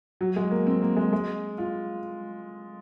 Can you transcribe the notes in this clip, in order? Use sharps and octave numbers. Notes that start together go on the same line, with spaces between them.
F#3
G#3
A#3
C4
A#3
G#3
G#3
F4